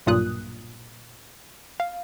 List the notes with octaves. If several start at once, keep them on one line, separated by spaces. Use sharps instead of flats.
B1 G2 A#2 D#6 F#6
F5